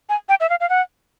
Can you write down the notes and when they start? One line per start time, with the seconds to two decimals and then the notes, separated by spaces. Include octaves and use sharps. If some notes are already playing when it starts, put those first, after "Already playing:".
0.09 G#5
0.29 G5
0.40 E5
0.50 F5
0.60 F5
0.70 F#5